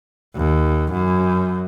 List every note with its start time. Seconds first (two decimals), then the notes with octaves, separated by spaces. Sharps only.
0.36 D#2
0.92 F#2